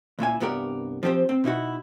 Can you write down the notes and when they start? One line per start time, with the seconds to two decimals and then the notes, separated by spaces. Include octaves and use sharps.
0.19 C#2 A#2 E4 G#5
0.40 C2 G2 B3 G4 A#4 D5
1.03 F3 C4 G4 C5
1.29 C4
1.44 B2 D#4 E4 F#4